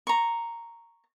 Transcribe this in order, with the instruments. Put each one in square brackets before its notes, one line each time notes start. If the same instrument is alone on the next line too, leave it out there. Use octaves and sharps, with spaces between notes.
[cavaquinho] A#5 C#6